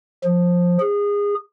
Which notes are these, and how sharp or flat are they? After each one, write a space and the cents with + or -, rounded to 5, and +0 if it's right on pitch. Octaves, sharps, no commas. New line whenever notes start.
F3 +15
G#4 -25